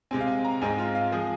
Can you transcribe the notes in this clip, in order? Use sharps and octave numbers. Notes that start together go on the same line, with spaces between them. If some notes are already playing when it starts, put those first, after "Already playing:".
C3 G#3 C4 G#5
F5
G#5
A#5
G#2 G#3 C4 G#5
F4
F5
F3 G#3 G#4